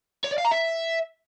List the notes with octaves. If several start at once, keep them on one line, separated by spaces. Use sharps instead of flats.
C#5
D5
F5
A#5
E5